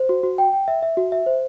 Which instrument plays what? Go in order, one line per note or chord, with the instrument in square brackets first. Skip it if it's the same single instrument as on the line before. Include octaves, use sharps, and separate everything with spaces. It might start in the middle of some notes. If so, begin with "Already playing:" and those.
Already playing: [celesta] C5
F#4
F#4
G5
G5
E5
E5
F#4
E5
C5